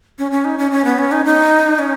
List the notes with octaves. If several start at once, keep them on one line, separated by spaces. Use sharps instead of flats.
C#4
C#4
D#4
C#4
C#4
B3
C#4
D#4
D#4
C#4